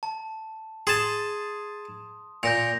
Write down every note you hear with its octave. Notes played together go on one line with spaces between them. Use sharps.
A5
G#4 A5 C6 D#6
A#2 G6 A#6 F7